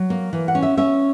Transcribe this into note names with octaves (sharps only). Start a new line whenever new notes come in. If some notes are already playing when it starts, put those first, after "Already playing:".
Already playing: F#3
A#3
E3
F#5
C#4
E5
C#4 E5